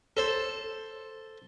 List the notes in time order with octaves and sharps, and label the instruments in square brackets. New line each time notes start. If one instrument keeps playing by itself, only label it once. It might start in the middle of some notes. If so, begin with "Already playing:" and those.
[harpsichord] A4 C5